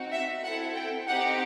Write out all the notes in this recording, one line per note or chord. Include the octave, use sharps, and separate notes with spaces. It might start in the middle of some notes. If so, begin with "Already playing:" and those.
Already playing: C4 D#4 F#4
E5
C4 E4 A4 F#5
G5
C4 D#4 G4 F#5